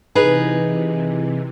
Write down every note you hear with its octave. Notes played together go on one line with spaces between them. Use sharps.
C3 E3 D#4 G#4 B4